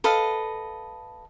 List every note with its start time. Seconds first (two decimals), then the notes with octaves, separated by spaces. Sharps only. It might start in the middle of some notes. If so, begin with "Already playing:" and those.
0.04 A4 B4 D#5 F5